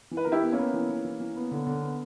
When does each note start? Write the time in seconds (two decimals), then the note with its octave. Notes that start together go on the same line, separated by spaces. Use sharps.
0.11 E3
0.17 B4
0.24 A#4
0.27 E3 E4 G4
0.42 B3
0.52 A#3 C#4
0.58 B3
0.74 E3
0.89 E3
1.05 E3
1.20 E3
1.36 B3
1.51 D3
1.67 D3
1.82 B3